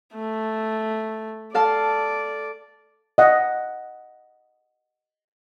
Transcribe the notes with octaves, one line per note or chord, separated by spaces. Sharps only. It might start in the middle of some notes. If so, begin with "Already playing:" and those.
A3
A4 D5 F5 A5
D#5 F#5